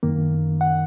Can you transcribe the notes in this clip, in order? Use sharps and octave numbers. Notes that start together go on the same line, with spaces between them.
F#2 D#3 A#3
F#5